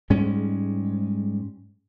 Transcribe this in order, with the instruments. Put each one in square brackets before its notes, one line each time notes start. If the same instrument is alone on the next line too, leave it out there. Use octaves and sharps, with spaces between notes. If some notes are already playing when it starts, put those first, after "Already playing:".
[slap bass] G#2 G3 G#3 C#4